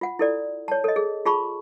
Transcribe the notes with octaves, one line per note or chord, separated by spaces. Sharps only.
F4 F#5
E4 A4 D5
C#5 A5
A4 D#5
G#4
F4 G#4 A5 B5 C#6